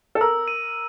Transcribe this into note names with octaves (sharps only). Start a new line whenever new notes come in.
A4
A#4 E6
D#7